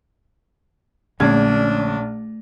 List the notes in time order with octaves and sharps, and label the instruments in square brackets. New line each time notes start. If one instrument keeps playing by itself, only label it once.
[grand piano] A#1 C#4 [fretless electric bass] A#2 D3 G#3 [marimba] A3 G#6 [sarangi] D4